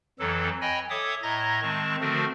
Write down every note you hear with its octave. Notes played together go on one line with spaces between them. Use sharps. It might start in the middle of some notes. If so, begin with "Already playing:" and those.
F2 E3 F#3 A4
C#5 D#5 G5 G#5 B5
A4 C#5 E5 D6 D#6
A2 D#5 E5 A#5 G#6 A#6
D#3 G#3 C4 A5 C#6
D3 F3 A3 C4 F#4 A#4